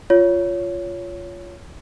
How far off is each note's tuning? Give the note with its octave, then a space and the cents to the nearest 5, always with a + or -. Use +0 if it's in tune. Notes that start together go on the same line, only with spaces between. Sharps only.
F4 -5 C#5 +15